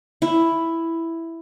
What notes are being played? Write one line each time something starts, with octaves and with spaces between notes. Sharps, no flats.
E4